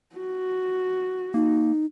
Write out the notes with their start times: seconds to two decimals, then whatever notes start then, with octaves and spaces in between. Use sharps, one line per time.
0.15 F#4
1.34 A#3 D#4